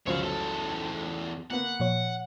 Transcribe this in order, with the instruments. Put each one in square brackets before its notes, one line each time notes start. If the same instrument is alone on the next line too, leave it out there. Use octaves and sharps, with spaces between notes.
[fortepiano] C#2 F#2 F3 [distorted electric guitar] C#5 F5
[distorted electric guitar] E2 A4
[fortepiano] A#3 B3 [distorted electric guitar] F#5
[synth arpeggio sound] A#2 F3 C#5